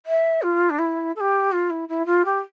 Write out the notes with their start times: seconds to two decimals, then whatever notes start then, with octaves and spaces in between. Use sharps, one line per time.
0.06 E5
0.42 F4
0.70 D4
0.79 E4
1.16 A4
1.20 G4
1.52 F4
1.70 E4
1.89 E4
2.06 F4
2.25 G4